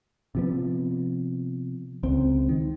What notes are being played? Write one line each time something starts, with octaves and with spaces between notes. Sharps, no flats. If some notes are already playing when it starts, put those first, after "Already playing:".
C3 F3 B3
C#2 C4
D#3